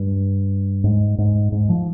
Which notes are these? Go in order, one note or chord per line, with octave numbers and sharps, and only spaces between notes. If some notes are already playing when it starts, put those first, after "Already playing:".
Already playing: G2
G#2
G#2
G#2
F3